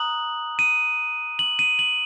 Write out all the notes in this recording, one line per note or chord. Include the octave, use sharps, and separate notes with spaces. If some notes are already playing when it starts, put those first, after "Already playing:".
Already playing: A#5 D#6 F#6 F#7
D#7
F#7
D#7
F#7